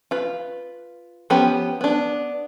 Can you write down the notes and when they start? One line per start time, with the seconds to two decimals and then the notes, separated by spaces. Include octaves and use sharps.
0.11 F4 B4
1.30 F3 B3 C#4 G4 B5
1.81 B3 D4